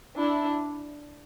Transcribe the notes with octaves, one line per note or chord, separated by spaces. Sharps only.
D4 E4